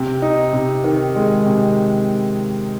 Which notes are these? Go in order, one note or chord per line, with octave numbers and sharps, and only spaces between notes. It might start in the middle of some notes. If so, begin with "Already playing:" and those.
Already playing: C3
D#4
C3
D#3
G#3
C3